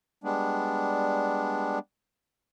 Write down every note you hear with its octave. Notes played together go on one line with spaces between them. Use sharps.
G3 G#3 B3 D4